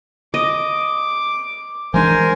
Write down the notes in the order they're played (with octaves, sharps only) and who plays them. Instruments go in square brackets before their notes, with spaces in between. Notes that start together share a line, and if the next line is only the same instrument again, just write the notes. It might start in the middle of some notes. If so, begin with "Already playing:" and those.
[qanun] D#5 [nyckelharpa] D6
[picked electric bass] E3 G#3 D4 [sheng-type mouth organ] A#4 C5 [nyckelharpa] G#5